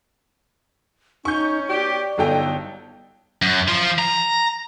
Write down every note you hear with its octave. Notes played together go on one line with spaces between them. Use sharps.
C#4 D#4 C#6 G6
B2 C#4 G4 D5
G1 F#3 D#4 A4 G5
F#2
F3 F4
A#5